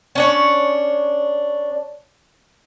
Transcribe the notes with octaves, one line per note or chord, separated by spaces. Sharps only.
C#4 D4 C#5